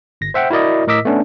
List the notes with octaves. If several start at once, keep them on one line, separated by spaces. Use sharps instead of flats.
G1 A#6
C5 E5 F#5 G5
E4 F#4 A#4 D5 D#5
A2 A#4 D#5 D6 E6 B6
A3 B3 C#4 D4